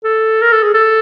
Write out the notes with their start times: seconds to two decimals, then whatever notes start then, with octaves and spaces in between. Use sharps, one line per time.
0.04 A4
0.42 A#4
0.52 A4
0.63 G#4
0.74 A4